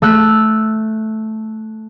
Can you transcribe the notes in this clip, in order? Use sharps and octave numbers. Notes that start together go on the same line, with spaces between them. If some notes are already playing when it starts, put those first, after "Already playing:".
A3 E6 F#6